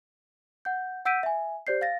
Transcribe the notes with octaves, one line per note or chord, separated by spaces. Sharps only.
F#5 G6
F#5 E6 G6 B6 D7 D#7
E5 G#5
G4 C5 D5 G6 C7
F5 A6 A#6